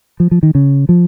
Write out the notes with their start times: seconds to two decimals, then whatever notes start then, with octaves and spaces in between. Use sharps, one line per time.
0.20 F3
0.31 F3
0.43 D#3
0.55 C#3
0.89 F3